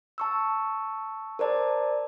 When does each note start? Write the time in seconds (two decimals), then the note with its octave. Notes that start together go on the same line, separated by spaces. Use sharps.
0.18 A5 C#6 E6
1.39 A#4 C5 D5 A5